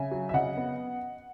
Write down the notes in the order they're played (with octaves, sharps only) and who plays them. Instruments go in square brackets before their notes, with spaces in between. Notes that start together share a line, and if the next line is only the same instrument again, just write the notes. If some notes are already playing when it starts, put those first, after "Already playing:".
Already playing: [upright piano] C#3 E5 G#5
F#3
E5
C#3 D#5 F#5
B3